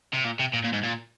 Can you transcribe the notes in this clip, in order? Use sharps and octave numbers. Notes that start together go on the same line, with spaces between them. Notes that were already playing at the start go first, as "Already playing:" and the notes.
C3
A#2
C3
A#2
A#2
G#2
A#2